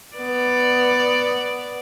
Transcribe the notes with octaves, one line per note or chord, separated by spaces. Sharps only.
B3 D5